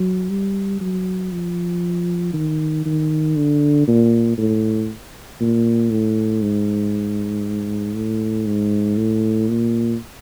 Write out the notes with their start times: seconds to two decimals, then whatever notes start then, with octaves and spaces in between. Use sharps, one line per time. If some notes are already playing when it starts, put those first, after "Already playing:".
Already playing: F#3
0.30 G3
0.81 F#3
1.32 F3
2.33 D#3
2.86 D#3
3.36 D3
3.88 A#2
4.38 A2
5.40 A#2
5.91 A2
6.42 G#2
7.96 A2
8.47 G#2
8.97 A2
9.48 A#2